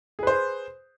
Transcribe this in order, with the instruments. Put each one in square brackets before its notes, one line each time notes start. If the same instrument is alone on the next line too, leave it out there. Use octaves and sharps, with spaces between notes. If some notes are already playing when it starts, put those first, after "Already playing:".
[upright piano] G#4
B4
C5